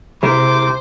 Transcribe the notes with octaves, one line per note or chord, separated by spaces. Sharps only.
C3 G#3 E4 A#4 C5 D6